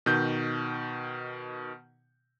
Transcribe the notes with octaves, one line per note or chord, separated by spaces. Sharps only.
B2 D#3 G6